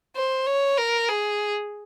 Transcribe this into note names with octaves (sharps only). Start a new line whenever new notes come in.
C5
C#5
A#4
G#4